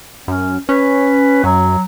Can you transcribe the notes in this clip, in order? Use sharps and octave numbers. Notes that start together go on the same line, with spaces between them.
F#2 C#4
C#4 B4
F#2 F#3